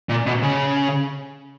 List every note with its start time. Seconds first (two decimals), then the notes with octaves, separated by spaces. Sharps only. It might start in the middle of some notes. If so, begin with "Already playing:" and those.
0.09 A#2
0.26 B2
0.42 C#3